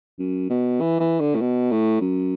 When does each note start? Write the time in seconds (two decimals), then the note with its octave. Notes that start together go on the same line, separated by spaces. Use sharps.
0.19 F#2
0.49 B2
0.80 E3
1.00 E3
1.20 D3
1.36 A2
1.41 B2
1.71 A2
2.01 F#2